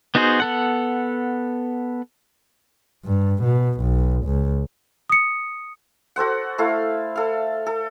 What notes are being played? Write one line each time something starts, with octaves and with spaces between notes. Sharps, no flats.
B3 D#4 F#4 G#4 C5
B3 A4 F#5
G2
B2
B1
C#2
D#6 C#7
F#4 A4 C5 F#5
A3 E4 A4 F5
A4 F5
A4